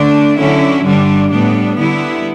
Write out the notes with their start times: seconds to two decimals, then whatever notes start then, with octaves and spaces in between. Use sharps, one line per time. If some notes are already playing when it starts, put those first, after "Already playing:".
Already playing: D3 A3 D4
0.38 D3 F#3 C#4 E4
0.84 G2 D3 G3 D4
1.31 A2 G3 B3 D4
1.78 D3 G3 B3 E4